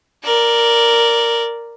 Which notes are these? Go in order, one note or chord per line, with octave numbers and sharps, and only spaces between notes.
A#4 D5